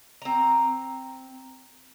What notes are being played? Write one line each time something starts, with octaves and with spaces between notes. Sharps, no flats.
C4 A#5